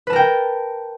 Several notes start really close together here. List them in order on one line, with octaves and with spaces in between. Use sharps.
B4 A5 A#4 G5